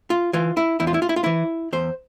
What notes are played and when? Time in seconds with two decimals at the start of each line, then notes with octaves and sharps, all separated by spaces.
0.10 F4
0.33 E3 F4
0.57 E4
0.80 E2 E4
0.87 F4
0.94 E4
1.02 F4
1.09 E4
1.16 F4
1.24 E3 E4
1.73 E2 C5